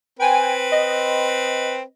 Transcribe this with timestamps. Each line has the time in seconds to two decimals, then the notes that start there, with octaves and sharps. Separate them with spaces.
0.19 C4 B4 G5 G#5
0.72 D#5